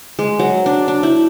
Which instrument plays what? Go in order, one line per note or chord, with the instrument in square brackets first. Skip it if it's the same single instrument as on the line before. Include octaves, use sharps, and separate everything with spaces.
[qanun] G#3
F#3
D4
D4
E4